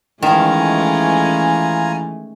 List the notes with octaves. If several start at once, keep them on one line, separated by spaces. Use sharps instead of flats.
D#3 E3 G#3 A3 C#4 F4 G#5 A#5